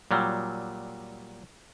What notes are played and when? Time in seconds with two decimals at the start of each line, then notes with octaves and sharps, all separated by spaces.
0.11 A#2 F#3 G3